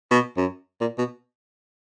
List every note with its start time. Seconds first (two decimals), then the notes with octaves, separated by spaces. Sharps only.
0.11 B2
0.37 F#2
0.81 A#2
0.98 B2